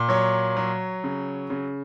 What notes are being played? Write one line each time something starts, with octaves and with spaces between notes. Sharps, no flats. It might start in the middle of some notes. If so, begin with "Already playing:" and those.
Already playing: A#2
F#3 C#5
F#3
C#3
C#3